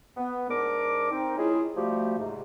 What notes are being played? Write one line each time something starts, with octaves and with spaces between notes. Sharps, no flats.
B3
G#2 D4 A#4 D6
C4 D#4
G#3 C#4 E4 F4 G#4
F3 G3 A3 F#4 G4
G#2 C3